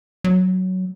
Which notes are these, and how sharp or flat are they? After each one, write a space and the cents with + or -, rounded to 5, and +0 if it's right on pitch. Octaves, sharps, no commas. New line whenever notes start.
F#3 +5